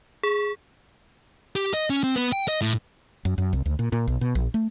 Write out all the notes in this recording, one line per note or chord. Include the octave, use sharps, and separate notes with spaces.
G#4
G4
D#5
C#4
C4
B3
G5
D#5
A2
F#2
F#2
C2
D2
A#2
A#2
B1
B2
A#1
A3